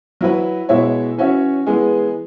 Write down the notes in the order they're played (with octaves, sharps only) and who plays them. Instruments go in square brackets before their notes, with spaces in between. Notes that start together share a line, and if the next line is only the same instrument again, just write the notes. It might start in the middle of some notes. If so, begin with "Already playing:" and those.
[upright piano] F#3 E4 B4
B2 G#3 E4 C#5 E5
E3 C#4 F#4 C#5 E5
E3 G#3 B3 G#4